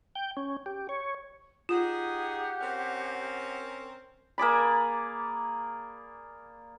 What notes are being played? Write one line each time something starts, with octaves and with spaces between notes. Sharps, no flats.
G5
C#4
G4
C#5
D#4 F4 G4 G#4 F#5
C4 C#4 A#4
A#3 G#4 D5 B5